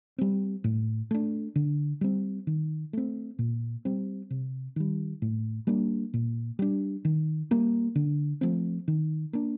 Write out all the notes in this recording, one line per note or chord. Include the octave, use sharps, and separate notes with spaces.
G3 C4
A2
A3 D4
D3
G3 C4
D#3
A3 C4
A#2
G3 C4
C3
D#3 G3
A2
G3 A#3 D4
A#2
G3 D4
D#3
G3 A#3
D3
F3 A3 C4
D#3
A#3 D4